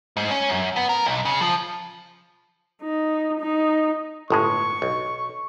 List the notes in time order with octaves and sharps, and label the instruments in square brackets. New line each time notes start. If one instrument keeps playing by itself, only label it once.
[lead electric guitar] G#2
C#4
F#2
B3
A#4
B1
C#3
F3
[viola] D#4
D#4
[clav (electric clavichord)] G1 A2 G#3 [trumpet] C#6
[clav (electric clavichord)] B1